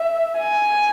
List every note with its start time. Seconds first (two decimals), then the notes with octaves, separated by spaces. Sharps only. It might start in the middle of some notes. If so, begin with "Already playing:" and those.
Already playing: E5
0.39 G#5